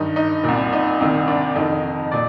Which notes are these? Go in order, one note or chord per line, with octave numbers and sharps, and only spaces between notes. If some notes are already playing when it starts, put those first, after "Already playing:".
Already playing: G2 D#3 D#4
D#4
C2 A#2
D#4
C2 C3 D#3
D4
F2 D#3 D#4
A#2 D5